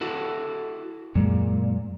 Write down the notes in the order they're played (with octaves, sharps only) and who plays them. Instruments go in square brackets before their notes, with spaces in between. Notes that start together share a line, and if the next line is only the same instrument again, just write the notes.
[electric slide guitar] E4 F#4 A4
[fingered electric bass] F#2 F#3 G#3 [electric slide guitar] A#2